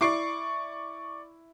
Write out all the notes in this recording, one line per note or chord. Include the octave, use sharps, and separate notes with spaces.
E4 D5 C#6 D6 C7 D7